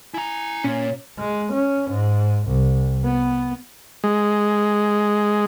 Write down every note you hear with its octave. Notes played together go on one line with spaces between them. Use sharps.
E4 G#5 A#5
A#2 C#4 C#5
G#3
C#4
G#2
C2
B3
G#3